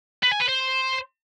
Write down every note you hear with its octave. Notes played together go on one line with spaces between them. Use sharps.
B4
G#5
B4
C5